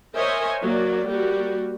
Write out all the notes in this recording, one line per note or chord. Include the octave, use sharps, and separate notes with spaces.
A#4 C5 C#5 D#5 E5 G#5
F#3 A#3 D5
G3 A#3 F#4